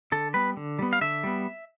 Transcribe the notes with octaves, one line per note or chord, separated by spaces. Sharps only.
D3 A4
G3 B3 B4
D3
G3 B3
F5
D3 E5
G3 B3